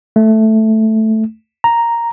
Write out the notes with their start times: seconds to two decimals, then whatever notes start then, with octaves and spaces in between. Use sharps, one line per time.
0.16 A3
1.64 A#5